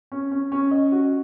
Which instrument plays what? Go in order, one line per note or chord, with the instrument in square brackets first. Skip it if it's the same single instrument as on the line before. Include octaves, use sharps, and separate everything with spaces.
[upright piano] C#4
C#4
C#4
D#5
F#4